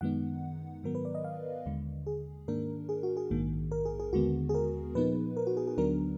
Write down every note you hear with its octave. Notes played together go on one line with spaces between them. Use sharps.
F#2 D#3 G#3 B3 D#4 F#5
G#2 D#3 F#3 B3 A#4
B4
D5
D#5
F5
D#2 D3 G#3
G#4
G#2 D#3 A#3 D4 A#4
G#4
F#4
G#4
A#1 G#2 D#3 A#3
A#4
G#4
G#4
D#2 D3 G#3 B3 F#4
G#4
A#4
A#2 F3 B3 D#4 B4
A#4
F#4
G#4
G#4
D2 D3 F#3 B3 D4 A#4